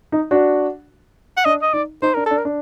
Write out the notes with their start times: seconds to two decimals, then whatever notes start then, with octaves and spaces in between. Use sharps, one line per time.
0.12 D#4
0.31 D4 F#4
1.37 F#5
1.45 D4 D#5
1.62 D#5
1.73 D#4 D5
2.02 D#4 C5
2.14 D4 A#4
2.26 D4 A4
2.38 A#4
2.45 D4